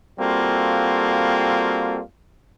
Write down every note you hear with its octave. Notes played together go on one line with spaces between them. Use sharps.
G3 A#3 C4 F4 F#4 A4